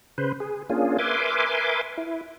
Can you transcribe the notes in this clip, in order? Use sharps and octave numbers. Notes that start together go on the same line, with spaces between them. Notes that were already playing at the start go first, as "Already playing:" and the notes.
C#3 B4 C5
G#4
A#3 C#4 D4 F4 G#4
A#4 B4 E5 G#5 C6 D6
E4